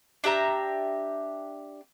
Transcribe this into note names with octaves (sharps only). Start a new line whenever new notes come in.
D4 G4 E5 A#5